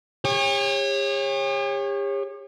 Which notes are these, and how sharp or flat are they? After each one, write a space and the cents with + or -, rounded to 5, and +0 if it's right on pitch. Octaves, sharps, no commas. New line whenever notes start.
G4 +45 C#5 -20